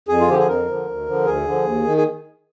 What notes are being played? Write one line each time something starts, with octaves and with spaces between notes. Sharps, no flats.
F2 G#4
F4
D3 F3 G4
G#4
F2 A#4
D3 F3
D2
D3 F3
D2 G#4
D3 F3
D#2
D#3
G#4